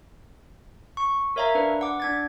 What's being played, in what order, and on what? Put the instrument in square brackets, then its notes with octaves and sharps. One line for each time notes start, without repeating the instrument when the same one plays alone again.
[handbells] C#6
A#4 C#5 E5 F5 A#5
D4 B4
F#5 D6
D4 G#6 A6